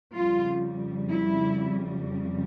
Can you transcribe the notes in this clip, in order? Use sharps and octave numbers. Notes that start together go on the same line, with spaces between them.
F2 C#3 G3 F4
E4